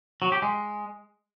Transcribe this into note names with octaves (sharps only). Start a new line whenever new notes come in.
F#3
G4
G#3